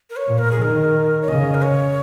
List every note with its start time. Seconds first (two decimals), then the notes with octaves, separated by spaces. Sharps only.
0.10 A#4
0.16 C#5
0.27 A#2
0.38 A#4
0.51 G#4
0.61 D#3 A#4
1.22 C#5
1.28 C#3 D#5
1.54 A#4
1.63 C#5